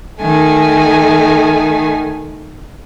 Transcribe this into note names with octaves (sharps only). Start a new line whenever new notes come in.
D#3 A3 G#5